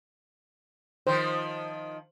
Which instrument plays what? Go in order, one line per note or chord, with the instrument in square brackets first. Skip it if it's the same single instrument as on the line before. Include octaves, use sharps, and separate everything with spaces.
[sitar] D#3 F3 [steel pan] C5